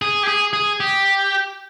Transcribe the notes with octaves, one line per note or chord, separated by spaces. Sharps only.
G#4
G4
G#4
G#4
G4